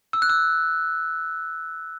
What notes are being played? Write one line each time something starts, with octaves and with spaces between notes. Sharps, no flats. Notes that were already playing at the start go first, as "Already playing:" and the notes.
E6
F#6
E6